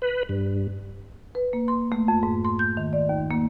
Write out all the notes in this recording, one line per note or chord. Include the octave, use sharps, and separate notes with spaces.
B4
G2
B4
A#3
C6
A3
F2
G#2
C6
G6
D#3
D5
D#2
A#3